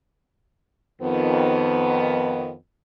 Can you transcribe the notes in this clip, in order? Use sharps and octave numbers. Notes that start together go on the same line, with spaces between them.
F2 D#3 B3